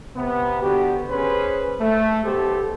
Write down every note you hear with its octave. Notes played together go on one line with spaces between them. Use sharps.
C3 B3
D3 B3 F#4 G4
C#4 G#4 B4 C5
A3
B1 B2 G4 A4 C5